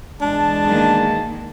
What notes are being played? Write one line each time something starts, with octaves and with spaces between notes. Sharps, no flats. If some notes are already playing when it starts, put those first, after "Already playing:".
E2 B2 G#3 D4 A5
D#3 A#3